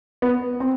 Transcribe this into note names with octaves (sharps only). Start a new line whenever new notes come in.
B3
C4